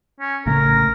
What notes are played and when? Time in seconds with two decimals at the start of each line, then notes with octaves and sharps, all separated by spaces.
0.21 C#4
0.46 A1 C#3 A3 A#4